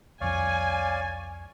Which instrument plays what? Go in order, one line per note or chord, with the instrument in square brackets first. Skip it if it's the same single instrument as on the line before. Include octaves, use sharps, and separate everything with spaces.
[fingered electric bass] C2 F2 F3 [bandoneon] C#5 D5 F5 [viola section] G#5